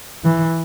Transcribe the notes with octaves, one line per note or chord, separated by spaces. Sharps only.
E3